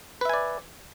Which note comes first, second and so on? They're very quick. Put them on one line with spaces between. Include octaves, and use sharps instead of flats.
B4 E5 G#5 D5